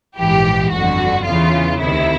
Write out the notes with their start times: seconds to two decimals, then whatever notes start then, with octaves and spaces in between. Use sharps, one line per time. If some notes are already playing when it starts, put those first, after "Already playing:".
0.17 A#1 G#2 E3 G4
0.71 G1 F2 D3 F#4
1.25 E2 C#3 E3 F4
1.79 D2 C3 D#3 E4